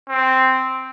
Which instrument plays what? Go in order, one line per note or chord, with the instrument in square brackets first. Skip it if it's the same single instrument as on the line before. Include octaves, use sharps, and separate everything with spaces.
[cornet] C4